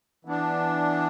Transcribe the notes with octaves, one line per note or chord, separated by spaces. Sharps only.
E3 B3 D4